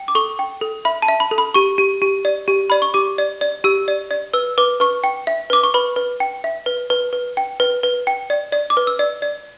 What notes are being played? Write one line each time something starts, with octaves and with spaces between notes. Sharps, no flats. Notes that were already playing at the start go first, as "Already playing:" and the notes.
Already playing: G5
D6
A4 C#6
G5
A4
E5 B5
A5
E5
B5
A4
B5
G4 C#6
G4
G4
D5
G4
D5 B5
C#6
G4 D6
D5
D5
G4 E6
D5
D5
B4 E6
B4 D6
B4 C#6
G5
E5
B4 D6
C#6
B4 B5
B4
G5
E5
B4
B4
B4
G5
B4
B4
G5
D5
D5
D6
B4
E6
D5
D5